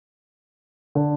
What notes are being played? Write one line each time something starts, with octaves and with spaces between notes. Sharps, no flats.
D3